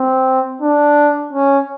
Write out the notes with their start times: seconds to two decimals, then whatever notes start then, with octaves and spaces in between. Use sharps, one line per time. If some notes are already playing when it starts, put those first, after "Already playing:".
Already playing: C4
0.62 D4
1.33 C#4